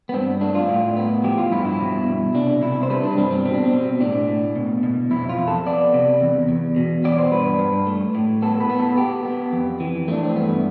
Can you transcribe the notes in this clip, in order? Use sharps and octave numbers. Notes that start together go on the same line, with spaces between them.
B3
G2 C4
A3 D4
F4
A2
B3
F3 G4
F4
G2 E4
E4
B2
B2
C3 D4
C3 E4
C5
G3 B4
D4
G2 C4
C4
B2 C4
D4
C4
B2
A2 D4
A2
B2
B2
F2 E4
F4
F2
A4
B3 D5
C3
E2
E2
B2
B3 D5
C5
G2 B4
G2
A3
A2
B3 A4
B4
B3
A4
B3 G4
B3
F2
E3
A3 D4
C4
G2 B3